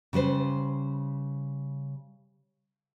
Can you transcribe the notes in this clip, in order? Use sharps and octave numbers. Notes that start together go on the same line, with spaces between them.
C#3 G3 B4 C5